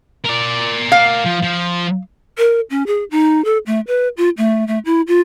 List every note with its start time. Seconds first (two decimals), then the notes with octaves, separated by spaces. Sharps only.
0.25 A#4 D5
0.92 F5
1.25 F3
1.43 F3
2.38 A#4
2.70 C#4
2.87 G#4
3.11 D#4
3.45 A4
3.66 A3
3.87 B4
4.17 F4
4.37 A3
4.67 A3
4.85 E4
5.07 F4